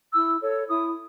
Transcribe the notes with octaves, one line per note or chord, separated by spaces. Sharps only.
E4 E6
A4 C#5
E4 D#6